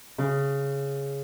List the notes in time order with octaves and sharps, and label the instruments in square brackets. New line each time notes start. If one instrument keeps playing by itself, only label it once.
[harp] C#3